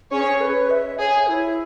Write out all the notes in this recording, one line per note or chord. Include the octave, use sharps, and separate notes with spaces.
C#4 G#4 C#5
B4
E5
G#4 C#5
E4